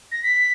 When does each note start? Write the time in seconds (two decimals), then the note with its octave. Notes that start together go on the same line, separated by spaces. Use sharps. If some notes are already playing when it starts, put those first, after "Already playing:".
0.12 A#6
0.23 B6